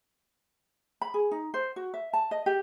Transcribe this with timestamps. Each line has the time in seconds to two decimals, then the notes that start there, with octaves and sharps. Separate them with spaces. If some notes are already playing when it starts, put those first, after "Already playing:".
1.02 B5
1.14 G#4
1.31 D#4
1.54 C5
1.76 F#4
1.94 E5
2.13 A5
2.31 D#5
2.46 G4